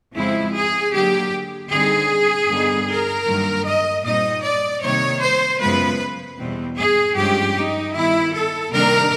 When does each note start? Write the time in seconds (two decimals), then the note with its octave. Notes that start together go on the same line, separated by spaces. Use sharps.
0.14 F2 C#3 F3 G#3 C4 E4
0.54 G#4
0.92 D3 F#3 A#3 G4
1.70 D3 G3 C4 D#4 G#4
2.48 G2 D3 G3 B3 D#4
2.87 A#4
3.26 G2 D#3 F#3 A#3
3.65 D#5
4.03 A#2 G3 C4 D#4 D#5
4.42 D5
4.82 C3 D#3 G3 A#3 D#4 C#5
5.21 C5
5.60 F#2 C#3 F3 G#3 B3 B4
6.38 E2 B2 G3 C4
6.77 G#4
7.16 G2 D3 F3 G#3 C#4 G4
7.55 D#4
7.94 D#3 G3 B3 E4
8.33 A4
8.71 C3 D#3 G3 A#3 D4 A#4